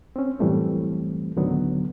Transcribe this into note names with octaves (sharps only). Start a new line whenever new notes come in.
C4 C#4
F#2 A2 E3 G3 A3 C4
D2 A2 D3 D#3 F#3 B3